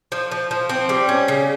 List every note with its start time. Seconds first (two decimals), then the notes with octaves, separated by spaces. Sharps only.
0.12 F3
0.31 F3
0.51 F3
0.69 C4
0.89 G3
1.09 C#4
1.28 C#3